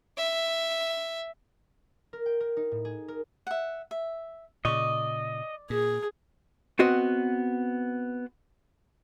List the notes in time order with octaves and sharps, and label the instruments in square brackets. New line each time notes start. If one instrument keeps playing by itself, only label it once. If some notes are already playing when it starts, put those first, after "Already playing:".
[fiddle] E5
[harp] A#4
G5
A#4
D#4
A2
G#4
A#4
[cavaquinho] E5 F#5
E5
[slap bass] A#2 C#3 [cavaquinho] D5 C#6 [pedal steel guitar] D#5
[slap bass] A#2 [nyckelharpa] G#4
[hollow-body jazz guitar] B3 C4 F#4 D#5